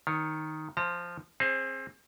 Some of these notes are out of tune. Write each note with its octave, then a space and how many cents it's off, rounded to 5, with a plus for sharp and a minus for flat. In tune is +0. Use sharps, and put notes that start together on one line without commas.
D#3 +0 C#5 +0
F3 -5 D#5 +0 A#5 -40
C4 +25 G#4 +0 C5 +30